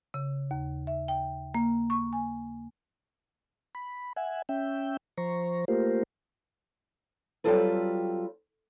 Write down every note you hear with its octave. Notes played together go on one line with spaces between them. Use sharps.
C#3
D#2
E5
G5
A#3
C#6
G#5
B5
E5 F#5 G#5
C#4 E5 G5
F3 C5 A#5 C#6
A3 A#3 F4 G4 A#4 C5
F#3 G3 C4 F4 A4 B4